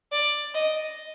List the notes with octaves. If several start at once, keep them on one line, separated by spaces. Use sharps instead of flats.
D5
D#5